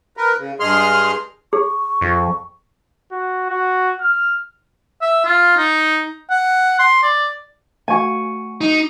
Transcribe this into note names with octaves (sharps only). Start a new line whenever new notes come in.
A#4 B4
C#3
G2 G#3 G#4 C6 F6
G#4 C#6
F2
F#4
F#4
F6
E5
F4
D#4
F#5
C6
D5
A3 F#4 G#5 C#6
D#4